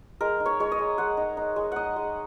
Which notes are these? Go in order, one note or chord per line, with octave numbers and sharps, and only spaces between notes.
G#3 A#4
D#4
C#5
G#3 C#5
D#5
G#3
G#3 F#5
D#4
D#4
G#3
D#4 D#5 F#5
G#3